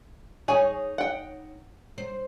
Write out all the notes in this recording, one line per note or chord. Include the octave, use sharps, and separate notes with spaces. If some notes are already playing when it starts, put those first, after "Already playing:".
D#4 G#4 C#5 G#5
F#5 G5
C5